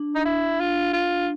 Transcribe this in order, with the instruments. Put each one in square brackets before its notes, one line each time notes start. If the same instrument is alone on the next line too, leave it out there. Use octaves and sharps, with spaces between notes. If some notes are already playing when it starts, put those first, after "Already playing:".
Already playing: [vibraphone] D4
[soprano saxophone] D#4
E4
F4
F4